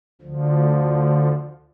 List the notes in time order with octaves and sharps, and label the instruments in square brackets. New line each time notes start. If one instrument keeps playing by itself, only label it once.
[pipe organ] D2 D3 F3